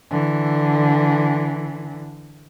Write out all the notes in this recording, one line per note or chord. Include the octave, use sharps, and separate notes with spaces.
D3 E3